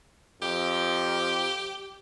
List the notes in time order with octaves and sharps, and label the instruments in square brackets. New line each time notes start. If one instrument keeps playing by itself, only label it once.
[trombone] F2 [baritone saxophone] G4